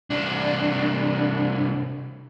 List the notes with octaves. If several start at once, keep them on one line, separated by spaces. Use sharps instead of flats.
C2 D4